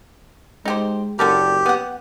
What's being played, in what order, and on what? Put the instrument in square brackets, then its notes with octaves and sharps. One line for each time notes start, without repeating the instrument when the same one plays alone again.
[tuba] G#3 [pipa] D#4 G4 C5
[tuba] F#1 [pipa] D3 A4 A#4 [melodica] G4
[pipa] B3 F#5